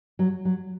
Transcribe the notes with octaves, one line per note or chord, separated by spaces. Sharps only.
F#3
F#3